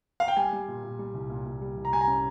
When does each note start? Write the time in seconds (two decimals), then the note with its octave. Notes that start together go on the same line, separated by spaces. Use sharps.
0.20 F5
0.28 G5
0.37 G3 G#5
0.53 G3
0.68 A#2
0.84 A#2
0.99 G3
1.14 C2
1.30 A#2
1.46 A#2
1.62 G3
1.77 C2
1.85 A#5
1.93 G3 G#5
2.01 A#5
2.08 C#4